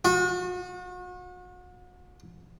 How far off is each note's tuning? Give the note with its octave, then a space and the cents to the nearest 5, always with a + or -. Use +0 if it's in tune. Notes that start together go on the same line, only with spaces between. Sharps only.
F#4 -40